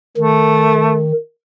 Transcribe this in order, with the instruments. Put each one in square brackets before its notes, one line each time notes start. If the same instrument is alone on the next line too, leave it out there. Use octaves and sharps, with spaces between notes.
[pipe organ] D#3 [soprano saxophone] A3